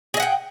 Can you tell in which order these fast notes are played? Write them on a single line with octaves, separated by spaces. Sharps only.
G#4 D#5 F#5 G5